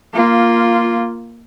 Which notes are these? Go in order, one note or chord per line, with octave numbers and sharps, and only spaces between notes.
A#3 F4